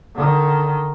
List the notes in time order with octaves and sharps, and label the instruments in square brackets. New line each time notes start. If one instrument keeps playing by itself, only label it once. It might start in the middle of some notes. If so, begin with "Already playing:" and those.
[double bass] D3 D#3